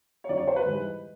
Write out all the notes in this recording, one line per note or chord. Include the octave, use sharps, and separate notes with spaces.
C#5
F2 D3 F#3 D5
C#5
C5
B4
G#2 E3 G3